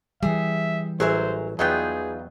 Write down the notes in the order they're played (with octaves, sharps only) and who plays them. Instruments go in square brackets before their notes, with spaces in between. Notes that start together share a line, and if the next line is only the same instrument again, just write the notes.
[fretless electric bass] E3 G3 [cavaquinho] G#4 [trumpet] E5
[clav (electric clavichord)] A1 F#3 [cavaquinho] G#4 A#4 E5 [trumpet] C5
[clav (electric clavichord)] E2 F#3 B3 [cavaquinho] D#4 F4 G5 [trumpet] G#4